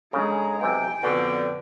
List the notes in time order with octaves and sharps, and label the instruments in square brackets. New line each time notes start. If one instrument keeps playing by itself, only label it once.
[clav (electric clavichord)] C#3 [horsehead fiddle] G#3 A#5 [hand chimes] D4 A4
[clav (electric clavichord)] B1 C3 [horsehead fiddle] G5 [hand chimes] G#5
[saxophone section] F2 B2 D3 [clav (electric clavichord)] F#4 [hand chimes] B4 D5 A5